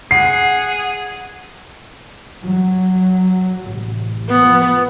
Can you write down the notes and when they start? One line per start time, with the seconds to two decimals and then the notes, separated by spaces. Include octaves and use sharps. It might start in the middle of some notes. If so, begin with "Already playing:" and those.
0.11 G#4 F#5 C7
2.41 F#3
3.64 A1 A2 C3
4.29 F3 B3